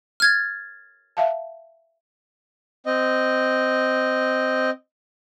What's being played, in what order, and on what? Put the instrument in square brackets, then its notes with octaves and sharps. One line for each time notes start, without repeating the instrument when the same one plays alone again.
[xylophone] F6 G#6 A6
[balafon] E5 F5 A5
[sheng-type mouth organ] C4 D#5